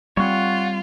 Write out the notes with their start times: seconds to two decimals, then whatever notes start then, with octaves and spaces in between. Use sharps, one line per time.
0.17 G3 A#3 C4 F4 C#5 F#5